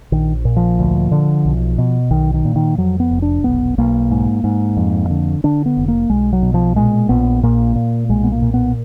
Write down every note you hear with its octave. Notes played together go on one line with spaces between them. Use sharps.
A#1 D#3
A#2
F3
D2
D3
B1
B2
B1 D#3
D#3
A#2
D#3
F2 F#3
B3
F1
D4
B1 B3
B1 A#3
G#2
G#2
F2
D3
D3 D4
B3
F1
A#3
B1 G#3
F#3
B2
F3
A#2 G#3
A#1 B3
A#2 A#3
A#2
B1 G#3
B3
A#3
A#2
B3